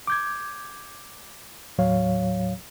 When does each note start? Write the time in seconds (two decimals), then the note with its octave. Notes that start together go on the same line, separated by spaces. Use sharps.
0.07 D6 G6 G#6
1.78 D#2 A2 F#3 C#5 F5